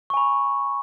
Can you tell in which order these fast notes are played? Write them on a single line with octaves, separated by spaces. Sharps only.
C#6 G#5 B5